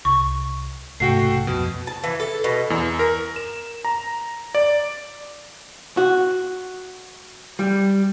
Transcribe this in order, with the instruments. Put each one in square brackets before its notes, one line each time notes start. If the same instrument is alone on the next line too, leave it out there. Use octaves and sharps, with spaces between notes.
[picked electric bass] C2 [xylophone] C#6
[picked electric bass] B1 G#2 C3 [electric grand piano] A3 F#4 G5 [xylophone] C7
[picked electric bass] F2 [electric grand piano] B2
[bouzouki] A5
E3
A4
B2
[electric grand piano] E2
A#4
E7
A#5
D5
[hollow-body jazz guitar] F#4
G3